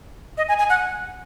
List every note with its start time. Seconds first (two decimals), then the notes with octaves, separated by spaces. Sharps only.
0.38 D#5
0.49 G#5
0.59 G#5
0.69 F#5